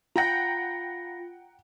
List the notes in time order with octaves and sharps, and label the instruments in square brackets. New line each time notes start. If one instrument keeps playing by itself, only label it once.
[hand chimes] F4 A#6 [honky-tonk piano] F#5 G5 A#5